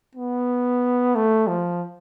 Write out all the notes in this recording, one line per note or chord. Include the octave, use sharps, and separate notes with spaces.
B3
A3
F3